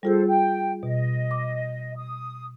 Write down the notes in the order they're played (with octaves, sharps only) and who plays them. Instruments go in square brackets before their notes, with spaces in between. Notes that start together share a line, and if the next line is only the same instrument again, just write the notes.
[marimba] G3 F4 G#4 [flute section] A4 C5
[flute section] G5
[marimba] B2 [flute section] D#5
[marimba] D6
[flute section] D#6